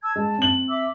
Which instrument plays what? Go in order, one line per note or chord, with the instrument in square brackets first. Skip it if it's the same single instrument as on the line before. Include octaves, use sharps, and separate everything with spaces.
[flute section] A5 E6 G#6
[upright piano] G#3 [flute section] A5
[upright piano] C4 F#7
[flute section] E5 D6 E6